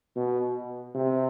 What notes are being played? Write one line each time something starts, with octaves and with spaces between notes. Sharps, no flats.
B2
C3